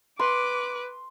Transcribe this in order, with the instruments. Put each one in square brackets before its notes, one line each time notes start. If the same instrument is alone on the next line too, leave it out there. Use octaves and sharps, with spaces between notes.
[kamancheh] B4 D6 [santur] C6